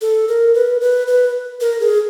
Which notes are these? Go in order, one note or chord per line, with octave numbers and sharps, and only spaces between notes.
A4
A#4
B4
B4
B4
A#4
G#4